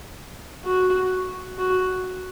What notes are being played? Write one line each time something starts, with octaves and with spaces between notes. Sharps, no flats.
F#4
F#4